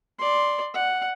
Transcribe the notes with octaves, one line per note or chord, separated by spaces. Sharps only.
D5 C6
F#5